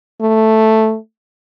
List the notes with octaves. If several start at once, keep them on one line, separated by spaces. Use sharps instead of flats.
A3